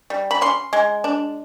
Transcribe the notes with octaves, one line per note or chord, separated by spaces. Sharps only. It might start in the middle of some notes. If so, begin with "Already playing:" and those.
G3
B5
C#4 C6
G#3
D4